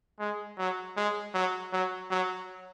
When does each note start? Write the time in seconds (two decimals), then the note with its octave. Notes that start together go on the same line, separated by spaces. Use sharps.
0.20 G#3
0.58 F#3
0.97 G#3
1.34 F#3
1.73 F#3
2.11 F#3